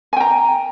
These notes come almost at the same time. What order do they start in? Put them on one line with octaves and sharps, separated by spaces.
G#5 G5 A#5